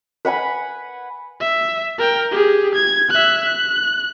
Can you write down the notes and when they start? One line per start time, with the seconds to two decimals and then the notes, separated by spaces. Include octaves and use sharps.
0.25 B4 F#5 G#5 B5
1.40 E5
1.98 A#4 G5
2.32 G4 G#4
2.75 G#6
3.10 E5 F#6
3.45 F#6